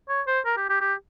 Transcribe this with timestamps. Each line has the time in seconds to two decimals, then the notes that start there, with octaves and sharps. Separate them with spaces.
0.09 C#5
0.27 C5
0.46 A#4
0.57 G4
0.70 G4
0.81 G4